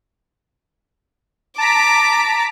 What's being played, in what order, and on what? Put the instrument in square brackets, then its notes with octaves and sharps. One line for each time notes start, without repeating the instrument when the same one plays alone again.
[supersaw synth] A5 A#5 B6 [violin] D6